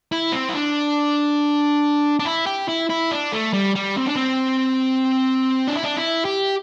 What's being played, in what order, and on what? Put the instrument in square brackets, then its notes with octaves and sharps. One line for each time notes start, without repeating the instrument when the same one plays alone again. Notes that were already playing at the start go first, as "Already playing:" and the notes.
[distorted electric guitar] E4
C4
E4
D4
D4
E4
G4
E4
E4
D4
A3
G3
G3
C4
D4
C4
D4
E4
D4
E4
G4